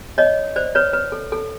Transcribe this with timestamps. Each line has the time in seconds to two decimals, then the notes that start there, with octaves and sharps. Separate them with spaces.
0.18 C#5 D#5
0.56 C5 D5
0.75 B4 C#5
0.93 B4
1.12 A4
1.32 A4